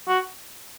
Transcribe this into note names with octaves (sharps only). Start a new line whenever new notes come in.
F#4